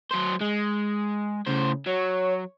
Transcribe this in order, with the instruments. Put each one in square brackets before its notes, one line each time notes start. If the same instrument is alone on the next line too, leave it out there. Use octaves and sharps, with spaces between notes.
[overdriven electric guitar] F#3 C5
G#3
[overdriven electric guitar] A2 C5 [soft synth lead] C#3
[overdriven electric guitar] F#3 [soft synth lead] C#5